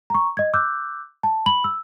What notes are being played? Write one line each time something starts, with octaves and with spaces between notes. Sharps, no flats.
A#5 C#6
D#5 G#6
D6 E6 F#6 G6
A5
B5 F#7
E6